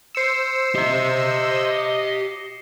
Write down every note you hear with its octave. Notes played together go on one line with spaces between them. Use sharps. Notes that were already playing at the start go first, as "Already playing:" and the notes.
C5 E6 C7 C#7 E7
G4 D#5 E5